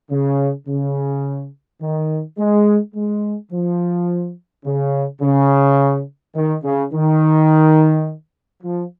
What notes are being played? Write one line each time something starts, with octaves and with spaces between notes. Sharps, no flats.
C#3
C#3
D#3
G#3
G#3
F3
C#3
C#3
D#3
C#3
D#3
F3